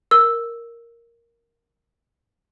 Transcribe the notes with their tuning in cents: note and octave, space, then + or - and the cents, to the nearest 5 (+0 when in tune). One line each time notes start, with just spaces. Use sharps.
A#4 +0 E6 +0